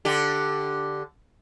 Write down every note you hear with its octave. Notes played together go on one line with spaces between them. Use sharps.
D3 G4